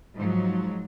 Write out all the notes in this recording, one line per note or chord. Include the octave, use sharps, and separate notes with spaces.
G#2 F3 F#3